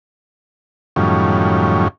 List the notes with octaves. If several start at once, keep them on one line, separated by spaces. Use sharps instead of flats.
F#2 A2 D#3 F3 G3 C#4